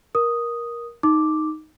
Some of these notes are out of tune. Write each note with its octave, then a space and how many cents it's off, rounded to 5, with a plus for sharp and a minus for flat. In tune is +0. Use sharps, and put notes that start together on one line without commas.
A#4 +15 D#6 +0
D#4 +0 D6 +0